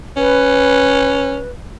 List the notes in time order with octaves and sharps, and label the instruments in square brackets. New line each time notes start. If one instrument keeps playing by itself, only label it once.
[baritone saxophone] C#4 [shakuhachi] B4